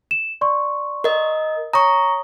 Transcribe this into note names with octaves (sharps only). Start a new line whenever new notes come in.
E7
D5 C6 C#6
A#4 D#5
C#5 A#5 C#6 D#6